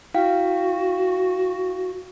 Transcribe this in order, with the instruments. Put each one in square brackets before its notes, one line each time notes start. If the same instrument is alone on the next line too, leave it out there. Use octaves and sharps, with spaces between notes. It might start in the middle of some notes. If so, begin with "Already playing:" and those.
[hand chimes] E4 F5 G5 [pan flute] F#4